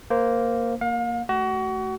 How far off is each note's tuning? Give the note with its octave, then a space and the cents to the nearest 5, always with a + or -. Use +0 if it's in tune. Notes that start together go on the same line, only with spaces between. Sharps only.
A#3 +0 C5 -15
A#3 +0 F5 +35
A3 +0 F#4 +30